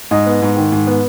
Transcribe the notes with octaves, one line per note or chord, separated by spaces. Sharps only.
G#2 D#5
B3
G#2
D#3
G#2
B3